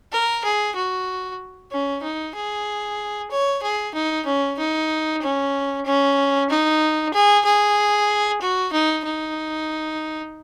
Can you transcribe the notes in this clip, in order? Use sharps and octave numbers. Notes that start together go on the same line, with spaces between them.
A#4
G#4
F#4
C#4
D#4
G#4
C#5
G#4
D#4
C#4
D#4
C#4
C#4
D#4
G#4
G#4
F#4
D#4
D#4